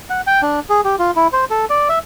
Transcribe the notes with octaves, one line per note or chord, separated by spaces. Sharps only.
F#5
G5
D4
G#4
G4
F4
E4
C5
A4
D5
E5